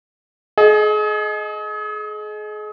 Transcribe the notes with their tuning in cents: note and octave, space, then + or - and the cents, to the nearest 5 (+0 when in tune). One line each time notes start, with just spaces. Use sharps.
G#4 +35 D#5 +0